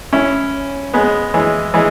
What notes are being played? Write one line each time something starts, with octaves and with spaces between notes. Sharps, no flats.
C#4 E4
G#3 B3
E3 G#3
E3 G#3